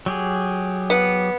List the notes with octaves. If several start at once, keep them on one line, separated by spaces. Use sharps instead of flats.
F#3 G4 G#4
B3